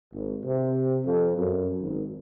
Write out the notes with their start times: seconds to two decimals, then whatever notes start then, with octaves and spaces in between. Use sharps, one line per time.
0.13 G#1
0.45 C3
1.05 F2
1.37 F#2
1.81 G#1